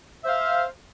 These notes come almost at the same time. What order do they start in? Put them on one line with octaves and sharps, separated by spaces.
E5 C5 F5